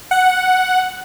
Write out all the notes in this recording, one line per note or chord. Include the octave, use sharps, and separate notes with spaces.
F#5